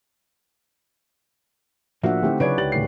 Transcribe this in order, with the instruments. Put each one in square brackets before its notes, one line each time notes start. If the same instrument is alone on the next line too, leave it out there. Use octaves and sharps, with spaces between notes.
[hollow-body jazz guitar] A2 F3 A#3 [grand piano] D4 F#4 [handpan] E5 F#5
[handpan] D3 D#4 E4 [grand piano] A3 C4 G4
[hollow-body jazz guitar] C#3 F#3 G#4 [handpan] B4 C#5 D5 [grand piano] G#6 D7
[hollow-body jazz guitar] C#2 [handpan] G4 D5 [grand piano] A6 F#7
[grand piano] D1 D#3 C7